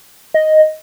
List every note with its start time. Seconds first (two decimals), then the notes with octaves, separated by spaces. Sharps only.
0.34 D#5